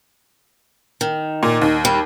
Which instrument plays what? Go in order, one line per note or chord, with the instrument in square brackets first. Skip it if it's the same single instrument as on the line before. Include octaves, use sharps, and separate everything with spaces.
[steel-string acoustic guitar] D#3
[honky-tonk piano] A#2
D#2
[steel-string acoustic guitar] G3